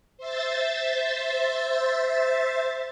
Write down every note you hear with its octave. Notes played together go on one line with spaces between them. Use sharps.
C5 E5 A6